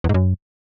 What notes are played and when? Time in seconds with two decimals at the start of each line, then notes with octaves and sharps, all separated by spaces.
0.04 E2
0.09 G#2
0.14 F#2